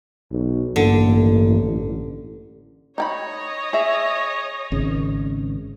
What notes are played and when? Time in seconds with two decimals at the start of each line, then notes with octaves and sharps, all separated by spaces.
0.31 B1
0.76 A1 G2 D3 E3 A#3
2.98 D#4 C#5 D#5 G5 B5
3.73 G#4 E5
4.72 G#1 C#3